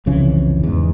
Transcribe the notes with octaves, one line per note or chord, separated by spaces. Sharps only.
C2 F2 C#3 E3
E2 G#2